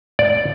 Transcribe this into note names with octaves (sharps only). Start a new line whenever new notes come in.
D5